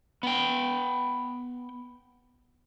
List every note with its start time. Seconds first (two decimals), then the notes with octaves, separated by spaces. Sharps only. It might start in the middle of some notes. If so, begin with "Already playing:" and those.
0.23 B3 G5